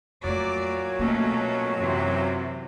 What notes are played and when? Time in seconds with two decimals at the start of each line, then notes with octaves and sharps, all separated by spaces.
0.24 F2 A#2 F#3 A3 D5
0.99 B2 A3 A#3 C#4
1.77 F#2 C3 E3